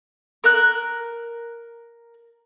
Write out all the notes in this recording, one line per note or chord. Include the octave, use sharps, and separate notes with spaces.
A#4 F#6